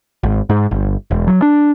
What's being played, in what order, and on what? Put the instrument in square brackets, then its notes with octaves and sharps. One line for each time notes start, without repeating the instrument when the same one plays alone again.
[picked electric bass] G#1
G#2
G1
E1
F#3
D4